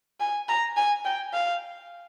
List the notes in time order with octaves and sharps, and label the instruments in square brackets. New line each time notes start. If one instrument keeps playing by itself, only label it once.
[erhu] G#5
A#5
G#5
G5
F5